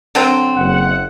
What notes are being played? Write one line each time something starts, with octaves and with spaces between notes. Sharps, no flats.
D3 F#3 C4
F#1 F#5